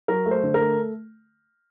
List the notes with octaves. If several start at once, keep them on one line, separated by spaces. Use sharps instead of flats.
F#3 A#4
A3
C5
D3
A#4
A3